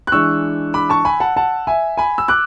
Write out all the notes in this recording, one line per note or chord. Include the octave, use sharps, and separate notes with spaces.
F#6
E3 G#3 D4 C#6 E6
B5 D6
A5 C#6
G#5 B5
F#5 A5
F#5 A5
E5 G#5
G#5 B5
E6
D6 F#6